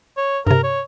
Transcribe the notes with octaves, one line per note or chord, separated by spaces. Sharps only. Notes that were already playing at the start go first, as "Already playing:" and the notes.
C#5
G2 C3 A#4
C#5